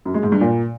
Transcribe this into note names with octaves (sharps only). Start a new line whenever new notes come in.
F#2
G#3
G#2
G2
A#2